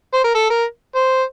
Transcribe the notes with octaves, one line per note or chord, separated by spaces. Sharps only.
C5
A#4
A4
A#4
C5